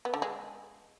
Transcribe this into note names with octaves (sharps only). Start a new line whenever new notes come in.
B3
D3
G#3